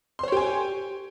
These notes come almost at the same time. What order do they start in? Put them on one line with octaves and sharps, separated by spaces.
C6 C5 C#5 G4 G#5